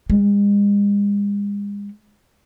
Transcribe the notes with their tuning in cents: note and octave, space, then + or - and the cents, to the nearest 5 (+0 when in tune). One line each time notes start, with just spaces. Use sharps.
G#3 -40